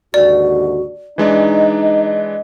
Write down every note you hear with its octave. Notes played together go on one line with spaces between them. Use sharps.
D#2 G#2 D3 F#4 D5
E3 G#3 D4 D#4 D#5